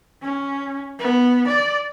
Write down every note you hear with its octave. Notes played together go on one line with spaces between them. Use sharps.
C#4
B3
D5